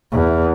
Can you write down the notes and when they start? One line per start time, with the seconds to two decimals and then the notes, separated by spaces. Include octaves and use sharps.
0.12 E2